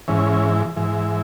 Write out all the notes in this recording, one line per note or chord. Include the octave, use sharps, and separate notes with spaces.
G#2 E3 C#4
G#2 E3